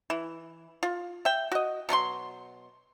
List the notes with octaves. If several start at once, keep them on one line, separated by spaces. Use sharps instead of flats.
E3
F4
E5 G5
F#4 D#5
B2 F#3 C#4 C6